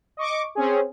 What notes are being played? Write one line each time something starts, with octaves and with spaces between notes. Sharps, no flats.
D#5 C#6 D6
C4 C#4 G#4